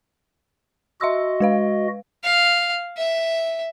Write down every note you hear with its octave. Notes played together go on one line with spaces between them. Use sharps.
F#4 D#5 E5 C6 E6
G#3 B4 F5
F5
E5